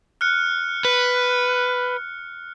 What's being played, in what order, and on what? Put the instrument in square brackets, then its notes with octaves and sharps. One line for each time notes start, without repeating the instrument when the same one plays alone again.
[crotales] F6 F#6 C#7
[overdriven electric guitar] B4